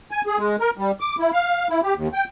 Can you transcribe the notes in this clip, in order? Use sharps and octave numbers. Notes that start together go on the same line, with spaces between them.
G#5
G#4
G#3
A#4
G3
D6
E4
F5
E4
G4
D#2
G5